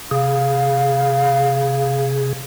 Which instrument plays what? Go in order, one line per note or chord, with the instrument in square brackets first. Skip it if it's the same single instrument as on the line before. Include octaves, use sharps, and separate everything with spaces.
[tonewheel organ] C3 G#4 [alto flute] F5